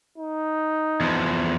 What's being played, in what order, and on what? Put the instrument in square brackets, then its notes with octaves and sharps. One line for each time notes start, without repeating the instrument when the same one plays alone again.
[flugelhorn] D#4
[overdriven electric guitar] E2 F3